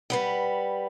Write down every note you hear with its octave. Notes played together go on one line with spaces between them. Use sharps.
G3 B4 F#5